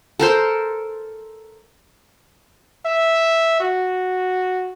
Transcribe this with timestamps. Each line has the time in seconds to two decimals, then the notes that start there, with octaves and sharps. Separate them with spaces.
0.19 A4 A#4 C5
2.85 E5
3.60 F#4